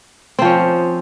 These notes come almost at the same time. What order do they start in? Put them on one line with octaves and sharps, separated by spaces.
C4 F3 C#4